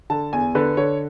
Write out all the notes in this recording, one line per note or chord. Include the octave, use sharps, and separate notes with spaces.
D3 A5
E2 G#5
D3 B4
D3 C#5